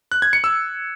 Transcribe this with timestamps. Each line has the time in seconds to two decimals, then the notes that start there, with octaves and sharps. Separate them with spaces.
0.12 F#6
0.22 G#6
0.33 C#7
0.44 E6